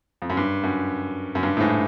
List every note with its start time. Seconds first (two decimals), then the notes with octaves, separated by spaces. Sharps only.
0.22 F2
0.30 F#2
0.37 G2
0.64 F#2
1.35 F#2
1.43 G2
1.57 A2
1.61 G#2